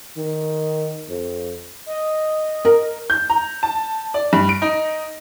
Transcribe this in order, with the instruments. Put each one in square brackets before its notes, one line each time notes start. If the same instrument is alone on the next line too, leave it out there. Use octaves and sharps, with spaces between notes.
[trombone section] D#3
F2
[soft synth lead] D#5
[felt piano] A#4
[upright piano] G6
A#5
A5
D5
G2
D7
D#4